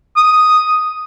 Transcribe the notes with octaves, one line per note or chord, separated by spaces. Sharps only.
D#6